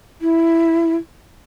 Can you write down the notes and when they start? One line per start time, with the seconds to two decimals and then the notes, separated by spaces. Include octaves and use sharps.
0.21 E4